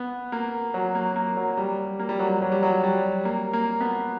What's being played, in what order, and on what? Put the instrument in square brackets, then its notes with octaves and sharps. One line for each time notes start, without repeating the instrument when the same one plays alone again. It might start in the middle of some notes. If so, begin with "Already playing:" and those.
Already playing: [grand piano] B3
A#3
F#3
A#3
A#3
F#3
G3
A#3
G3
F#3
G3
F#3
G3
F#3
G3
A#3
A#3
B3